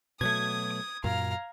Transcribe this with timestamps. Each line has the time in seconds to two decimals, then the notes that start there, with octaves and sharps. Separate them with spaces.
0.21 B2 F#3 A3 D#6 G#6
1.04 F#2 A#2 F5 A#5